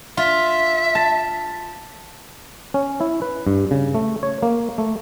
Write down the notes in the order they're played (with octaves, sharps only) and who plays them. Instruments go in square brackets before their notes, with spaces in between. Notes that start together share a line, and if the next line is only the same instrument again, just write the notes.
[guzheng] F4 [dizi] E5
[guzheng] A5
[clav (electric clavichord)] C#4
E4
B4
G2
C#3
A3
C#5
A#3
A3